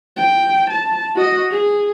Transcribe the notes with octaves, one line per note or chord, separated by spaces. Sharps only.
G5
A5
F#4 D#5
G#4